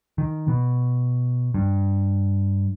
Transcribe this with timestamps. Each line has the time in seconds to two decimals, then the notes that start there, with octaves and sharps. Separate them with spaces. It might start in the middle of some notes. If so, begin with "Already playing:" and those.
0.18 D#3
0.48 B2
1.54 G2